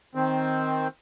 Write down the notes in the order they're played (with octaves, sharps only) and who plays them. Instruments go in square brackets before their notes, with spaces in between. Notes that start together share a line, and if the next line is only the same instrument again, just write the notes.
[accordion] D#3 C4